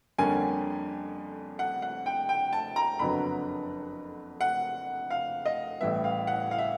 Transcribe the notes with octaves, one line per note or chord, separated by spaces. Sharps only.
F2 D3 G3 A#3 C#4 G#5
F#5
F#5
G5
G5
A5
A#5
F#1 F2 D3 F#3 B3 B5
F#5
F5
D#5
A1 A2 E3 G3 B3 E5
F5
F#5
F5
E5